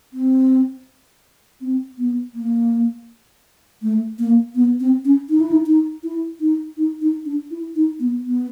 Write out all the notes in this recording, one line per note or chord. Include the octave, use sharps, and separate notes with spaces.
C4
C4
B3
A#3
A3
A#3
B3
C4
C#4
D#4
E4
D#4
D#4
E4
D#4
D#4
D#4
D4
E4
D#4
B3
B3